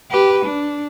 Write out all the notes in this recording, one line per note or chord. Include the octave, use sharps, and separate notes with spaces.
G4 B4
D4